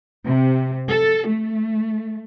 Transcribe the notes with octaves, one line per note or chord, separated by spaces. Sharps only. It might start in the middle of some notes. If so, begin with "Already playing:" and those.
C3
A4
A3